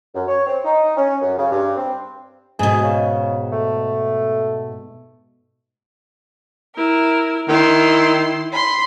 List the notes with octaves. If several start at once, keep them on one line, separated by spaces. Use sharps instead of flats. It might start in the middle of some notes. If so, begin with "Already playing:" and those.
F#2
C#5
C4
D#4
C#4
F#2
C#3
G2
C4
G#2 B2 G#4
C#3
A3
E4 A#4
D#3 E4 C6
B5 C6